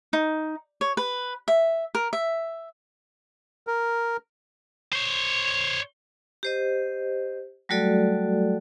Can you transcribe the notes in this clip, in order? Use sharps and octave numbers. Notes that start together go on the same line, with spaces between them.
D#4
C#5
B4
E5
A#4
E5
A#4
C5 C#5
G4 C5 D#5
F#3 G3 A3 F#4 A4 D5